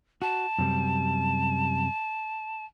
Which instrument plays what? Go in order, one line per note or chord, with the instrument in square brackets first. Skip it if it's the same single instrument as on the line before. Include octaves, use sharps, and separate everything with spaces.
[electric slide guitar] F#4 [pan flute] A5
[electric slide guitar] F#2 C3 G3